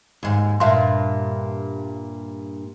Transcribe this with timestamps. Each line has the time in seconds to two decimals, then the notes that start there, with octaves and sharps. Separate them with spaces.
0.23 D#2 G#2
0.60 G2 A#2 E5 F5 C6